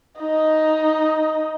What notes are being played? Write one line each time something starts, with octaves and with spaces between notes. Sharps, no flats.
D#4 D#5